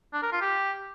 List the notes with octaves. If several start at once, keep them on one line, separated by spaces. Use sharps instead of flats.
D4
A#4
F4
G4